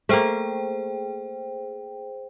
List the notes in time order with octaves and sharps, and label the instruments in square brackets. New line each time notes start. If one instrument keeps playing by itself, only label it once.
[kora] A3 A#3 [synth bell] G#4 C5 G5